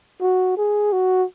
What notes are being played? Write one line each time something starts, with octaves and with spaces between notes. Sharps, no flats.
F#4
G#4
F#4